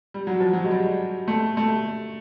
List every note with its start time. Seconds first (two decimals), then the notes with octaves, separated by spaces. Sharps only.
0.14 G3
0.27 F#3
0.40 F3
0.53 F#3
0.65 G#3
0.71 G3
1.28 A3
1.57 A3